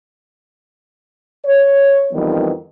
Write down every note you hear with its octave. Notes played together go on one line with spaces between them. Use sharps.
C#5
F2 D#3 E3 G3 B3